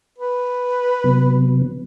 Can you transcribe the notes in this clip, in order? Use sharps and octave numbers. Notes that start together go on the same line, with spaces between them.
B4
C3 F#3 B3